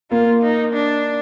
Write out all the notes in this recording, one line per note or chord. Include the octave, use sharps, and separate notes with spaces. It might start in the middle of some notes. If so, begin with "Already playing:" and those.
A#3 F4
D#4
D4